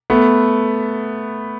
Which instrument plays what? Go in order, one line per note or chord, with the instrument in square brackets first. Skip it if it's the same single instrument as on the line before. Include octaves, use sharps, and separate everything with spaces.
[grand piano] A3 B3